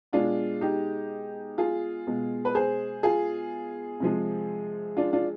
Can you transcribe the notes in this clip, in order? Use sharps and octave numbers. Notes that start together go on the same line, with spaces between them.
B2 G#3 D4 F4
D#4 G4
F4 G#4
B2 G#3
B4
G#4 C5
F4 G#4
C3 F3 G#3
D4 F4
D4 F4